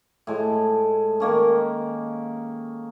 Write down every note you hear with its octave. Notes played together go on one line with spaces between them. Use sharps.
A2 G#3
D#3 A#3 C#4